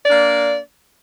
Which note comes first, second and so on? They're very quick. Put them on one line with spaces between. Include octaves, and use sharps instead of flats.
D5 D4 A#3